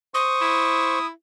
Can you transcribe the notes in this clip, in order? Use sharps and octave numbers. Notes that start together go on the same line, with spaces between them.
C5 C#6 D#6
E4